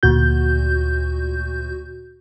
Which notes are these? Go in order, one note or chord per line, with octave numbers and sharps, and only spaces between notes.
D2 A#2 F#4 G6